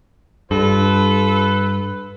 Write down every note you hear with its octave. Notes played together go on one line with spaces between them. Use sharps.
G2 F4 A4 B4